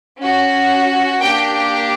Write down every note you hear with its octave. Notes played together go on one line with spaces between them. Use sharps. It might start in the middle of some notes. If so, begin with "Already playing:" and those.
C#4 F#4
A#3 D4 G4 G5